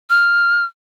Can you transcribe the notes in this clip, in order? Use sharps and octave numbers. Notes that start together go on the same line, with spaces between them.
F6